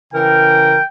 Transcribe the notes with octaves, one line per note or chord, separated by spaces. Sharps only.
C#3 E3 A#4 G5